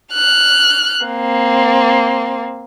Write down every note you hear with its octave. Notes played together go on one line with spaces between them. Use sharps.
F6 F#6
A#3 C4